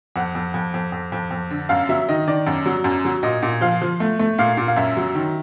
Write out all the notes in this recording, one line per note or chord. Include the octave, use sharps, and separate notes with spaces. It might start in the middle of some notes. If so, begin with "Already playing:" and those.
F2 F#5
F2
F2
F2
F2
F2
F2
D3
F#2 F5
F#3 E5
D#3 D#5
D#3 D5
F#2
F#3
F#2
F#3
A#2 D#5
A#2
F3 F5
F3
A3
A3
A#2 F5
A#2
F5
F#2 E5
F#3
D#3